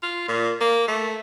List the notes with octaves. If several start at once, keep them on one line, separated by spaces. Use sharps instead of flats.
F4
A#2
A#3
A3